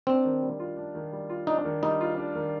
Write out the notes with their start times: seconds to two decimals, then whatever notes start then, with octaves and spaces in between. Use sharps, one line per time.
0.07 C4 D4
0.25 D#3
0.42 G3
0.60 F4
0.77 D4
0.95 D#3
1.13 G3
1.30 F4
1.47 D4 D#4
1.65 D#3
1.82 G3 D#4
2.01 F4
2.18 D4
2.35 D#3